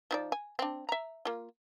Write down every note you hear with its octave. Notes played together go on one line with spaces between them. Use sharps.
F3 D#4 D5
G#5
C4 D4
E5 A#5
A#3 F4